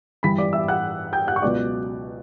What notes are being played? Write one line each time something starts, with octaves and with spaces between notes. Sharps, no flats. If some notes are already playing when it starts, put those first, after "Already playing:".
G2 E3 G3 B5 B6
D5 D6
E5 E6
F#5 F#6
G5 G6
F#5 F#6
C#6
C#2 B2 F#3 D5 D6